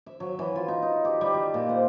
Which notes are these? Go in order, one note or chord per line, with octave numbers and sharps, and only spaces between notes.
E5
F#3
E3
F4
D#4
D#4
G4
G3
G3
A#2
C5